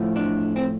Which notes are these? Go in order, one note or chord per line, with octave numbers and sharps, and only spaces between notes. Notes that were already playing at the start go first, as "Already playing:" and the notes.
Already playing: A2 F3 A3
D4
C4